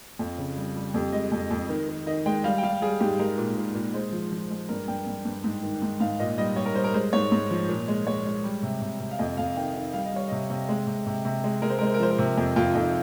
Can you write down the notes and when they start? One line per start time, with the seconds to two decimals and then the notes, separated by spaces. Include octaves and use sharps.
0.19 F2 F4
0.38 C#3
0.57 G3
0.76 G3
0.94 F2 G4
1.13 G#3 D#5
1.32 F2
1.51 F2
1.69 D#3
1.89 D#3
2.07 D#3 D#5
2.26 G#3 G5
2.44 G3 F5
2.58 G5
2.63 G3 F5
2.82 G3 G#4
3.00 G#2 G4
3.19 G#3 A#4
3.38 A#2
3.57 A#2
3.75 A#2
3.94 G#3 C5
4.12 F3
4.32 F3
4.50 G#3
4.69 G2 A#4
4.88 G2 G5
5.07 G2
5.25 G2
5.44 G#2
5.63 D#3
5.82 G#2
6.00 G#2 F5
6.19 A#2 D#5
6.38 G3 D#5
6.56 G3 C#5
6.66 A#4
6.75 G3 C5
6.84 A#4
6.94 G#3 C5
7.13 G#2 C#5
7.32 G#2
7.51 F3
7.69 A#2
7.88 G#3
8.06 G#3 C#5
8.25 G#3
8.44 G3
8.63 C3
8.82 C3
9.00 C3
9.11 F5
9.19 F2 D#5
9.37 F2 F5
9.57 D#3 G5
9.75 D#3 F5
9.93 G3 F5
10.05 D#5
10.13 G3 C#5
10.28 C3 D#5
10.50 C3
10.69 G#3
10.87 C3
11.07 C3
11.25 C3
11.44 G#3
11.62 G#3 A#4
11.70 C5
11.78 G#3 A#4
11.87 C5
11.94 A#4
12.00 F3 C5
12.11 A#4
12.19 C3
12.37 F2
12.56 F2 F4
12.75 F2 D#4